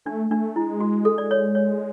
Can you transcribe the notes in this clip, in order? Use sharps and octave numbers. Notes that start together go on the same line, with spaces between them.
A3 D4
A3 D4
G#3 E4
F#4
A4
D5
C#5
C#5